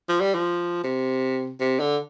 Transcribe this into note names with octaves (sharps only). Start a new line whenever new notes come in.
F3
G3
F3
C3
C3
D3